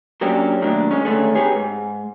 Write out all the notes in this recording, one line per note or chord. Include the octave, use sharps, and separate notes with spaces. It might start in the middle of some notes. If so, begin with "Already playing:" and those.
F#3 A#3 C#4 D4 G4
A2 D#3 F#3 A#3 D4
G#3 C#4
D3 D#3 G#3 A3 C#4
C4 D#4 G4 G#4 B4 C#5
G#2